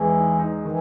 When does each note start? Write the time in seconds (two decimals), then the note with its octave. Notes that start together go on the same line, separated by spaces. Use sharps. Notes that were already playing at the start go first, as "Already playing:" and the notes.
Already playing: E2 E3 G#3 D#4
0.14 D#4
0.39 D#4
0.65 D#3 E3